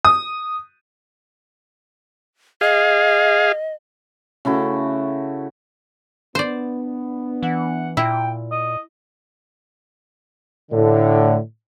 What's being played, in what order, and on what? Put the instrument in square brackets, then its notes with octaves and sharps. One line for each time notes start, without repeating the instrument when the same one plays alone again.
[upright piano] D#6
[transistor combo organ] G#4 F5 [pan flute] D#5
[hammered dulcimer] C#3 A3 E4 F#4
[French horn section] B3 D4 [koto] C5 D5
[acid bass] E3 [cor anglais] F#5
[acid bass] A#2 [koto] E4 [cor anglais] G5
[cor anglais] D#5
[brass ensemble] A2 D3